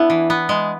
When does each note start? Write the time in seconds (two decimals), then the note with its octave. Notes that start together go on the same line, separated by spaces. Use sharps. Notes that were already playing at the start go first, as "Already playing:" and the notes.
Already playing: B3 D4 E4
0.10 E3
0.30 B3
0.49 G#3